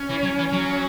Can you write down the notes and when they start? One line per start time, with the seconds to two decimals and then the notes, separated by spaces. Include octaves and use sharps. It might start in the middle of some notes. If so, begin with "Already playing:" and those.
Already playing: C#4
0.10 E3
0.23 F#3
0.39 E3
0.52 F#3